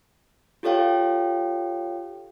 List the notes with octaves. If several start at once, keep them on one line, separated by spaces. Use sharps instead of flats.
F4 G4 A4 C#5 F5 G5